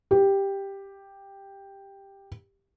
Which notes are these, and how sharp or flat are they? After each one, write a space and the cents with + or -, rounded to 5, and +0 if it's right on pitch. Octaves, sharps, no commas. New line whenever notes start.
G4 +5